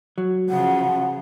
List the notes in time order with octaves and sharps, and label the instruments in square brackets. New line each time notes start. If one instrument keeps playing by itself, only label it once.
[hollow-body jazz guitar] F#3
[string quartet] C#3 F3 [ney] F#5